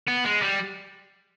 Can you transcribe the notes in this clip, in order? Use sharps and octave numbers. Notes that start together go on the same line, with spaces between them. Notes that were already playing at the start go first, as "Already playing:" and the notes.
B3
G#3
G3